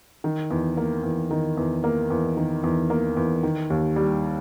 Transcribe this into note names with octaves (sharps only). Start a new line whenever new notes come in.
D#3
E2
A#3
E2
D#3
E2
A#3
E2
D#3
E2
A#3
E2
D#3
D#2
G3